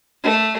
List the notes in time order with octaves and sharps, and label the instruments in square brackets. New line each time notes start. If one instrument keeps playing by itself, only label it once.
[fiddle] A3